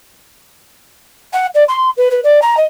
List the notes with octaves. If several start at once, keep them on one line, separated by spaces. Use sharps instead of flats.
F#5
D5
C6
B4
B4
D5
A#5
D#5